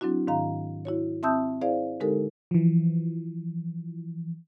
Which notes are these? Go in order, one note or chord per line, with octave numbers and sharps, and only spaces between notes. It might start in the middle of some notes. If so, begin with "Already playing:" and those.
F#3 C4 D4 E4 F#4
G#2 D#3 F5 A#5
E4 F#4 C#5
C4 E5 A5 D#6 E6 G6
E4 G#4 C5 D5 F5
D3 G#3 D#4 G4 A4 A#4
E3 F3